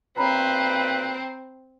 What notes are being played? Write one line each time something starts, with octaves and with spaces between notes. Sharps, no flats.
B1 A#2 C4 B4 A#5 B5